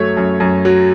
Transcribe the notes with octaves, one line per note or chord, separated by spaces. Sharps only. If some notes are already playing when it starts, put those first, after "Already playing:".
Already playing: F#2 F#3 A3 C#5
F#2
F#2
F#3